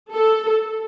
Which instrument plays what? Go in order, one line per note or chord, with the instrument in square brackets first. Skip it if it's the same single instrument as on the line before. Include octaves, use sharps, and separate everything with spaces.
[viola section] A4